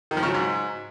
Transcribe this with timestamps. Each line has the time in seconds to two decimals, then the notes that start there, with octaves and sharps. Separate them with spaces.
0.11 D#3
0.17 F3
0.23 C#3
0.29 F#3
0.34 G#2